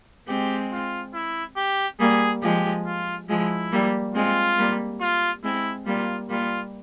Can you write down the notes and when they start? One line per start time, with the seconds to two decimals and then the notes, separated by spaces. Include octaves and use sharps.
0.28 G#3 C4 G4
0.72 F4
1.13 E4
1.57 G4
2.00 G3 A#3 G#4
2.42 F3 G#3 G4
2.85 F4
3.29 F3 G#3 E4
3.72 G3 A#3
4.14 G#3 C4 F4
4.58 G3 A#3
5.01 F4
5.44 G#3 C4 E4
5.86 G3 A#3 F4
6.29 G3 A#3 F4